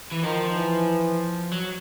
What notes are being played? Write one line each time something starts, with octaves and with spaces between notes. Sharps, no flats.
E3
D#3 F3
E3
F#3